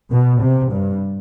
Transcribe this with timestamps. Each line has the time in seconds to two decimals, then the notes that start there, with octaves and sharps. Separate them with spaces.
0.11 B2
0.40 C3
0.71 G2